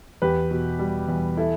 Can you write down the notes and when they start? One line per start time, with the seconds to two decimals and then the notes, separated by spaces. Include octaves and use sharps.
0.22 E2 G4 B4
0.51 B2
0.79 G3
1.08 E2
1.37 E4 A4